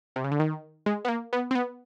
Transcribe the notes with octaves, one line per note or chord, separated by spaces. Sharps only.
C3
C#3
D3
D#3
G#3
B3
A#3
B3
C4
B3